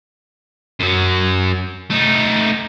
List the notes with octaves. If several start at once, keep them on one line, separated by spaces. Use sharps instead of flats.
F#2 F#3
A3 D#4